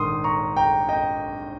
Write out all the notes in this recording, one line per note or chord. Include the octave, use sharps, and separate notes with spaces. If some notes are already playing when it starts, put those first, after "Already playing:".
Already playing: A#1 G#2 D#3 A#3 C6 D#6
A#5 C#6
G5 A#5
D#5 G5